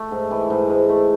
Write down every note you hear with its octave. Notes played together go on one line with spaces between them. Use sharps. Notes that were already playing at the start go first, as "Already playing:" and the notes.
Already playing: A3
G#2
E3
G#2
G#2
A3